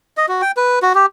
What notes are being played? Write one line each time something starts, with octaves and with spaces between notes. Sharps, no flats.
D#5
F#4
G5
B4
F#4
G4